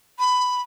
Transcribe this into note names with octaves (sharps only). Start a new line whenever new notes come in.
B5